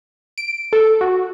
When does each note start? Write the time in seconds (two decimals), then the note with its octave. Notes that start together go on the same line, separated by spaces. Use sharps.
0.38 D7
0.73 A4
1.01 F#4